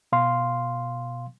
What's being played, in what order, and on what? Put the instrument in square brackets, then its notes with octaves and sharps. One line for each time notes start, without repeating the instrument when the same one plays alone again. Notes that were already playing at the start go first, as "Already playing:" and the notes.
[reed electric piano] B2 F5 C6